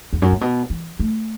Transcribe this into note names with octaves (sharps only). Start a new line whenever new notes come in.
E2
F#2
A2
B2
E3
A3